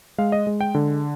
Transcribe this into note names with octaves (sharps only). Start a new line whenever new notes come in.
G#3 F5
D#5
G#3
G5
D3